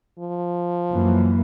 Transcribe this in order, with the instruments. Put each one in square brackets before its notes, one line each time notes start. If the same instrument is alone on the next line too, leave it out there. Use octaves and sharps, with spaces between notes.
[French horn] F3
[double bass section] F#2 E3 A#3